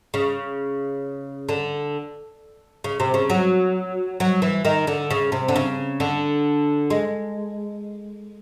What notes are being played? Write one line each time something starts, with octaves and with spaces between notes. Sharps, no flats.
C#3
D3
C#3
C3
C#3
F#3
F#3
E3
D#3
D3
C#3
C3
D3
C#3
D3
G#3